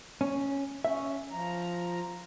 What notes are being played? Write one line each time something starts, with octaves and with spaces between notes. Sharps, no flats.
C#4
C#4 E5
F3 A#5